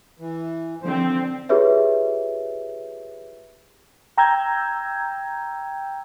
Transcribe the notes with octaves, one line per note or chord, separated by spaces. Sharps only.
E3
D3 F3 C4 C5
F4 G4 G#4 B4 C#5 E5
G5 A#5 E6 G6 G#6